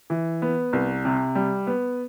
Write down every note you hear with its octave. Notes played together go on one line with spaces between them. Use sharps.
E3
B3
C2
C3
G3
B3